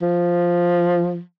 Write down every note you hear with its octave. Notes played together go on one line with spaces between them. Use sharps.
F3